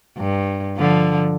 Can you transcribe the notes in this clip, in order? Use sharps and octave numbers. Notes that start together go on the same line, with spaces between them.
G2
D3 F3